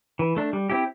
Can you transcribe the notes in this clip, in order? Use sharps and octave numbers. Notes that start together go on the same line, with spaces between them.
E3
A3 D4
G3
C4 E4 G4